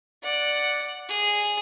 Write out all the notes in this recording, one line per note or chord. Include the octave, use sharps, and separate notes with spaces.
D5 F#5
G#4